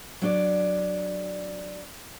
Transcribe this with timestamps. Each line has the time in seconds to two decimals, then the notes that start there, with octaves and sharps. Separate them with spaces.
0.22 F#3 D4 D5